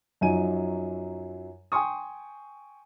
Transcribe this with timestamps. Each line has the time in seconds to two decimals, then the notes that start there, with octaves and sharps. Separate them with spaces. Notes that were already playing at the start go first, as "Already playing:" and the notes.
0.21 F#2 F3 F#3 D#4 G#5 D#7
1.72 G5 G#5 C6 C#6 D#6